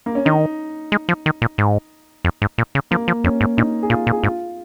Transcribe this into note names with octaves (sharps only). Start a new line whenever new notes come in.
A#3
C#4
D#3 D#4
G#3
F3
D#3
A#2
G#2
F2
G#2
A#2
C#3
F3 A#3
F3
F2 C#4
G#2
A#2 D#4
G#4
A#2 F4
A#2
G#4
G#2 F4